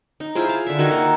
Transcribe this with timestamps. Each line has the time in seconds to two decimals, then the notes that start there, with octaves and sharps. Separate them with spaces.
0.20 D#4
0.35 E4 F4 G#4 C5
0.49 F5
0.67 D3 E5
0.79 D#3 F#4 E5 G#5
0.91 A#3 F#5